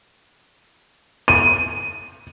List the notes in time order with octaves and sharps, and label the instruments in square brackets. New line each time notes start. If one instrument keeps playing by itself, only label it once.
[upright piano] D#7